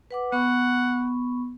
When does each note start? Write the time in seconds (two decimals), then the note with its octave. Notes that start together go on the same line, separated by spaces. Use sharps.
0.11 B4 F#5 D6
0.32 B3 F#5 B5 C#6